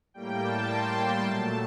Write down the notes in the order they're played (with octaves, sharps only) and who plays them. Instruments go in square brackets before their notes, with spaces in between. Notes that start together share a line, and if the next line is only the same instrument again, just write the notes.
[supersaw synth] A2 G3 A#3 G5
A5
C6
A5
A#2 F#3 A3